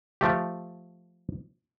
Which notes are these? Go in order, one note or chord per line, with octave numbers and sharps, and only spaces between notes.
F3 A3 G4